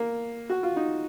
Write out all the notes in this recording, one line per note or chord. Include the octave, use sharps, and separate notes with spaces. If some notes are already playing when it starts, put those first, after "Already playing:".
Already playing: A#3
F#4
F4
D#4